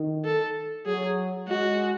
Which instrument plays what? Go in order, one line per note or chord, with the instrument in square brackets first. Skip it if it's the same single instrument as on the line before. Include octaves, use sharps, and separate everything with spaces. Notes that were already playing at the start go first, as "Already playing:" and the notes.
Already playing: [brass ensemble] D#3
[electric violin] A4
[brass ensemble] F#3 [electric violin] G#4
[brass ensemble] G#3 [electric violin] F#4